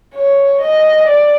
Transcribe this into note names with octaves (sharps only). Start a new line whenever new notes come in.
C#5
D#5
D5